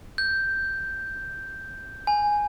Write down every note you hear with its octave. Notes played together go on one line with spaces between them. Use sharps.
G6
G#5